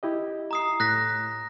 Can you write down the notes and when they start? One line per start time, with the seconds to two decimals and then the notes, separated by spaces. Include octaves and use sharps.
0.03 E4 G4 D#5
0.51 A#5 D#6 C7
0.80 A2 F#6 A#6 B6